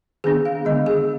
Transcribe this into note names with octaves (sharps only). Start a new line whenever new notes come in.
D#3 B3 D4 G#4
F5
D3 G#3 B3 D#5
G#4